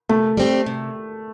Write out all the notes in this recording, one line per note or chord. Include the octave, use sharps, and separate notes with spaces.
C3 A3
G3 C4 G4
C3